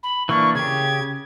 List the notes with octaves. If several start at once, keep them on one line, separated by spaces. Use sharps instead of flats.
B5
E3 A#3 D4 C#6
C#3 G4 G#6